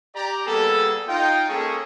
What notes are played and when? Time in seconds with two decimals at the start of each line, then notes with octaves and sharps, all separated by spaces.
0.15 G4 D5 A#5
0.46 G3 A#3 B3 G#4 A4
1.08 D#4 F4 G5
1.49 G#3 A#3 C#4 G#4 A4 C#6